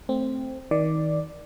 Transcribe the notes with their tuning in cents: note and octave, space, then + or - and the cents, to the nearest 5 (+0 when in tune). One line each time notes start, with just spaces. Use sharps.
A3 +0 C4 +0
D#3 +30 D5 +0